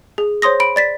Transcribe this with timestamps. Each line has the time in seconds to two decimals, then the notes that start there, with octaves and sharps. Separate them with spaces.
0.18 G#4
0.42 C5 C#5 C6 D#6 A#6
0.60 B5 D7
0.76 D5 A6 B6